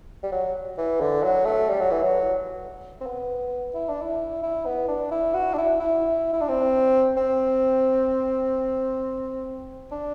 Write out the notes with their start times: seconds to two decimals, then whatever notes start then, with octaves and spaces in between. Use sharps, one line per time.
0.23 G3
0.32 F#3
0.78 E3
1.00 D3
1.23 F#3
1.45 A3
1.69 G3
1.80 F#3
1.91 E3
2.02 F#3
3.01 C4
3.06 B3
3.74 E4
3.88 D4
4.02 E4
4.43 E4
4.66 B3
4.88 D4
5.11 E4
5.34 F#4
5.53 D4
5.58 E4
5.80 E4
6.33 E4
6.41 D4
6.49 C4
7.17 C4
9.91 D4